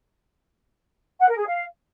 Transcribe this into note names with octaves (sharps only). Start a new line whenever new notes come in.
F#5
A#4
G#4
F5